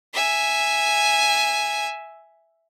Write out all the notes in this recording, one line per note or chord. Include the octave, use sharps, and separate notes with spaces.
E5 G#5